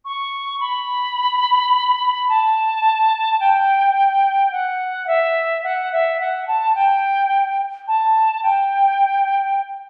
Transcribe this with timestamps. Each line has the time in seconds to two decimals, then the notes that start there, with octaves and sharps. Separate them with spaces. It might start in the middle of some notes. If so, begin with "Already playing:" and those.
0.05 C#6
0.60 B5
2.29 A5
3.40 G5
4.52 F#5
5.07 E5
5.64 F#5
5.92 E5
6.20 F#5
6.47 A5
6.75 G5
7.88 A5
8.43 G5